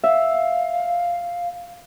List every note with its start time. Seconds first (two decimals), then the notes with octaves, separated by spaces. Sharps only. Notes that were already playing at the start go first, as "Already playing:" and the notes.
0.03 E5 F5